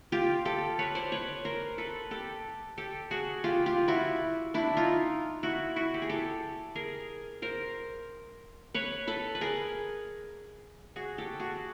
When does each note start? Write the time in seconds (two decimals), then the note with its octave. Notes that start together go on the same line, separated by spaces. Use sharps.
0.12 F4 G4
0.45 G4 A4
0.79 B4 C#5
0.95 C5 D5
1.12 B4 C#5
1.45 A#4 C5
1.78 A4 B4
2.11 G4 A4
2.78 G4 A4
3.11 F#4 G#4
3.44 F4 G4
3.66 F4 G4
3.88 E4 F#4
4.54 D4 E4
4.77 D#4 F4
5.43 E4 F#4
5.76 E4 F#4
5.94 G4
6.02 G#4
6.09 G4 A4
6.75 G#4 A#4
7.42 A#4 C5
8.74 B4 C#5
9.07 A4 B4
9.35 B4
9.41 G#4 A#4
10.96 F#4 G#4
11.18 G4 A4
11.39 F#4 G#4